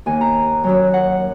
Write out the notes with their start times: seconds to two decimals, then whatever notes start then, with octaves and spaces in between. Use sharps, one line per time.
0.06 D#2 D#3 A#3 G#5
0.21 A#5
0.64 F#2 D#3 F#3
0.94 F#5